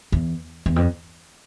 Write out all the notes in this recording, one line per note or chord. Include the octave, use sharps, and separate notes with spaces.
E2
E2
F2